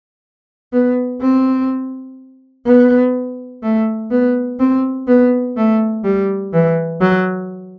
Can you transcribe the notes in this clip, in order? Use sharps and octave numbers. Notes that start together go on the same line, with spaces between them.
B3
C4
B3
A3
B3
C4
B3
A3
G3
E3
F#3